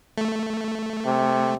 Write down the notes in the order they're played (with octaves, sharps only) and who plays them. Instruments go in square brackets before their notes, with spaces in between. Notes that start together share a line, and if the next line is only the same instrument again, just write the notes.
[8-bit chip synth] A3
[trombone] C3